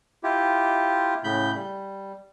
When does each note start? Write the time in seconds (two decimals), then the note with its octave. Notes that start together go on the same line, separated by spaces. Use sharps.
0.23 E4 F4 G4
1.24 A2 C#3 B5 G6
1.54 G3